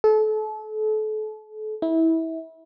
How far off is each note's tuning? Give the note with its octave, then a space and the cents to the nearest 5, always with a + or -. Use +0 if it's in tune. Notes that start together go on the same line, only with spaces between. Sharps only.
A4 -35
E4 -25